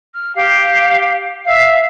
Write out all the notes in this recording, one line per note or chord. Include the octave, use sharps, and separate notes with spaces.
F6
G4 F5
E5 F5